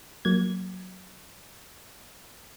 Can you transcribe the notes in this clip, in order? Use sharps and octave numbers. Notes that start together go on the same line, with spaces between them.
F#3 A#3 G#6